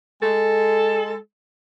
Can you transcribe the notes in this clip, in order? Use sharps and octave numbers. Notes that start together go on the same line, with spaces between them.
G#3 A4